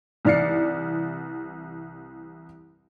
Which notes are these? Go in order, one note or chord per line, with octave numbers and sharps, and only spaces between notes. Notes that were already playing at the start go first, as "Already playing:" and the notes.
C2 E3 D5 F6 C7 C#7